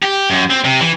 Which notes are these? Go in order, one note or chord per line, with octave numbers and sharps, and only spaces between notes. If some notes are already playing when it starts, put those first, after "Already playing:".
G4
F#2
C4
C3
E3